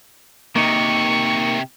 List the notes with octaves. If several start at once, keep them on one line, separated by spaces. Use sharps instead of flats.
C3 D#3 A#3 D#4 A#4 C#6